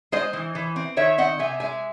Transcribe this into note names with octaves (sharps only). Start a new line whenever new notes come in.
G#3 C5 D#5
E3
E3
C4
D#3 C#5 E5
C4 D#5 F#5
C3 E5 G#5
G#3 E5 G#5